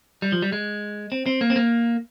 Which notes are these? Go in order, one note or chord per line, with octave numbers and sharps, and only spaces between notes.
G3
F3
G3
G#3
C4
C4
A#3
C4
A#3